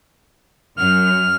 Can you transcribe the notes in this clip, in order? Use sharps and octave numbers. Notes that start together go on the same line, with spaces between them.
F#2 F6